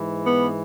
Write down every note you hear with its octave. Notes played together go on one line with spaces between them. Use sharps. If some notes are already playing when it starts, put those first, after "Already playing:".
Already playing: G#2 E3
B3